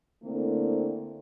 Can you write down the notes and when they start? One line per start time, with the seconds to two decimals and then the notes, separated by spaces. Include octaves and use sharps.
0.23 D3 A3 A#3 C4 E4